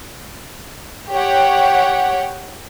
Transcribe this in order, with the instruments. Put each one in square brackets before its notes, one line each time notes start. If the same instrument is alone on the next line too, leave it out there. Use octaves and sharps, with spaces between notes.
[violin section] G4 C#5 F#5 G5